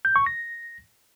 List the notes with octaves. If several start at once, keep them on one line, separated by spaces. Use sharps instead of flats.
G6
C#6
A#6